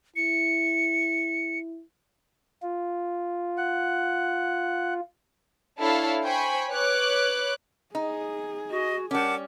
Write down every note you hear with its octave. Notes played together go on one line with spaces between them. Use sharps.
E4 C#7
F4
F#5
D4 E4 A4 C#5 F5
C5 G5 G#5 B5 C#6
B4 C#5 D6 F#6
D#4 G#4
F#4 D#5
G3 C#4 A#4 F#5 A5 D6